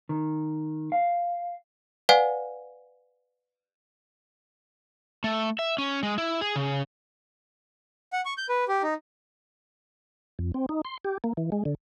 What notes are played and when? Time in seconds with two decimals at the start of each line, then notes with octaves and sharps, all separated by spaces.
0.09 D#3
0.92 F5
2.09 B4 D5 F5 F#5 G#5
5.24 A3
5.59 E5
5.78 C#4
6.03 G#3
6.18 E4
6.41 G#4
6.56 C#3
8.13 F#5
8.25 C#6
8.38 G6
8.49 B4
8.68 G4
8.83 D#4
10.39 F2
10.54 C4
10.69 D#4
10.85 C6
11.05 G4
11.24 A#3
11.37 E3
11.52 G#3
11.65 D3